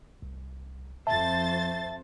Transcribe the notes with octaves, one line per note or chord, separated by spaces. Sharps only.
C2
F2 C5 E5 A5 A6